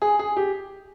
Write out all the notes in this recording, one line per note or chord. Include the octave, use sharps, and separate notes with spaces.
G#4
G#4
G4